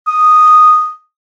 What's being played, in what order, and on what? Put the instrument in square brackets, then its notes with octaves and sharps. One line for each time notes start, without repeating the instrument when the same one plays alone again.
[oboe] D#6